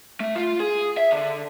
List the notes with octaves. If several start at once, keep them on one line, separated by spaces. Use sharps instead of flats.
A3
F4
G#4
E5
D3